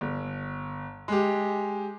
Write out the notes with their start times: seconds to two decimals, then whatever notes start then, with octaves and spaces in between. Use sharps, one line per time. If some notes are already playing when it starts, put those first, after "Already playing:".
0.01 G1
1.08 G#3 G4